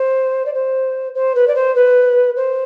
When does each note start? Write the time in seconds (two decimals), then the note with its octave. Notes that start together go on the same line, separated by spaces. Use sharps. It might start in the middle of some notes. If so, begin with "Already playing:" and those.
Already playing: C5
0.45 D5
0.53 C5
1.14 C5
1.35 B4
1.47 D5
1.55 C5
1.75 B4
2.36 C5